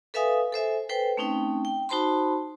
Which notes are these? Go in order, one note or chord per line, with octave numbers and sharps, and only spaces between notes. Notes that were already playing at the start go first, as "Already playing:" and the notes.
A4 B4 E5 F5 G#5 D#6
A4 C5 E5 G#5
A4 B4 C5 G5
A3 C4 C#4 D#4 G5
G5
D#4 F#4 C5 A5 B5 C6